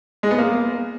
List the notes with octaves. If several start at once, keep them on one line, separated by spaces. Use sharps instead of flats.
G#3
B3
A#3